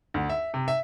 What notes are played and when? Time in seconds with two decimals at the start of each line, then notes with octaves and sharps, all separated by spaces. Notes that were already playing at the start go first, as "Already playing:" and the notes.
0.14 D2
0.30 E5
0.54 C3
0.68 E5